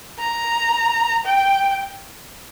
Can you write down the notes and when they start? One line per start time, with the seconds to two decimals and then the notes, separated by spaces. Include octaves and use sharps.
0.19 A#5
1.26 G5